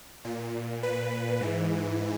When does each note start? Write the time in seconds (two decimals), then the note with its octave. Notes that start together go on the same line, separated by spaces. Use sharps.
0.25 A#2
0.83 B4
1.41 G#2 E3